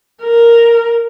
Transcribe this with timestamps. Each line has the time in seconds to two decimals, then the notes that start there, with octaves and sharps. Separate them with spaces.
0.23 A#4